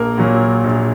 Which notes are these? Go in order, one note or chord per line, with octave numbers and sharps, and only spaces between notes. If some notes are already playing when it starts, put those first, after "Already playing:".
Already playing: A#1 A#3 A#4
A#2 F#3
A#1